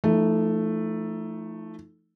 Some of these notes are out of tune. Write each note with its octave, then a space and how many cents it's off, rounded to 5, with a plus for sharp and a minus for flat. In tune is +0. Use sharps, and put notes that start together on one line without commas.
F3 -35 A3 +0 D#4 +10